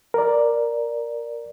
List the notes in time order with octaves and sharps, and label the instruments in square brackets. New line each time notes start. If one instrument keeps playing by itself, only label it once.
[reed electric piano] A#4 D5